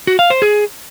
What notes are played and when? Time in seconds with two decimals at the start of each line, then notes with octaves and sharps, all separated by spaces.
0.07 F#4
0.19 F5
0.30 C5
0.42 G#4